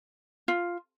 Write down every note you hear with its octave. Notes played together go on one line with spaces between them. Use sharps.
F4